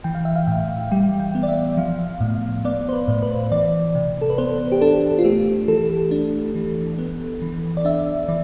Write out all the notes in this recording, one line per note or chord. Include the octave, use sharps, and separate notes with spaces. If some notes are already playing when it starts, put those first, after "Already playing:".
E3 G5
F5
E5
F5
A2 G5
G3 G5
G5
B3
D5
E5
F3 F5
A2 F5
B3 D5
C5
B4
A2
B4
E3 D5
C3
A4
B4
B3 C5
G4
D4 A4
F4
A3 G4
E3 A4
D4
E3
B3
E3
D5
D4 E5
E3 D5